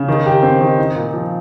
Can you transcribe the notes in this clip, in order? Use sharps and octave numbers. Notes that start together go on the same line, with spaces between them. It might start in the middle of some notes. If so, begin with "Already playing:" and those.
Already playing: C#3
D#3
G4
C4
D#3
D#4
A#2
F3